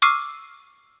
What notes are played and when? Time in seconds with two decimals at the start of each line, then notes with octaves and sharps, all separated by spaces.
0.02 C#6 D6 E6 F6 C7 D#7